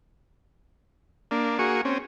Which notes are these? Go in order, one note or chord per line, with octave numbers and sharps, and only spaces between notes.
A#3 D4
A#3 F#4 G#4 C#6
C4 C#4